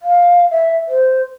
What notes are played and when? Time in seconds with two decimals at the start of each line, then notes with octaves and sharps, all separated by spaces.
0.02 F5
0.51 E5
0.88 C5